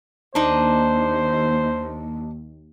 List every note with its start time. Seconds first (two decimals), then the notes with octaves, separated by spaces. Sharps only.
0.35 D#2 D4 D#4 C5